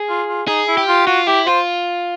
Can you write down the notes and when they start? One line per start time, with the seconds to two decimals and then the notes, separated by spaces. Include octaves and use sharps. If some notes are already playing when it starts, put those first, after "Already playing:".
Already playing: G#4
0.09 F4
0.28 F4
0.48 D#4 G#4
0.68 E4
0.77 G4
0.88 F4
1.07 F4 F#4
1.27 E4 G4
1.46 F4 C5